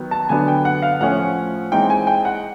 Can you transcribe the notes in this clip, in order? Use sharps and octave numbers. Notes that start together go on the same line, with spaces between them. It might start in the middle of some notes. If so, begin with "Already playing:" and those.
Already playing: D#3 F#3 B3
A5
D3 F#3 B3 D4 G#5
G5
F#5
F5
A2 F3 A3 C#4 F#5
E3 G#3 C4 D#4 G5
G#5
G5
F#5